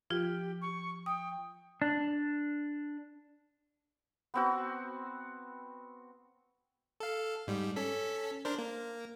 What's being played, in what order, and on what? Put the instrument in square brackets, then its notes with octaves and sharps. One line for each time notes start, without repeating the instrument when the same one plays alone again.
[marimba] F3 F4 [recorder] G4
[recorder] C#6
[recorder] G5 [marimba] D#6
[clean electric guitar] D4
[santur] B3 C4 F#4
[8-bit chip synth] A4 F5
G#2 G3
C#4 A4 B6
D4 A#4 C5
A#3